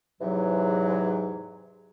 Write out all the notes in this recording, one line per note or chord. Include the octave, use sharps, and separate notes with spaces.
E2 G#2 C3 E3 F#3